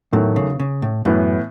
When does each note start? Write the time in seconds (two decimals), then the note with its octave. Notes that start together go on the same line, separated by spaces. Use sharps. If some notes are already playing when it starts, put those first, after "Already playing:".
0.12 E2 A2 D#3 F#3 A3
0.36 C#3
0.60 C#3
0.82 A2
1.05 F#2 A2 E3 B3